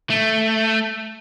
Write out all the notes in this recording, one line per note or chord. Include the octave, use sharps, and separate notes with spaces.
A3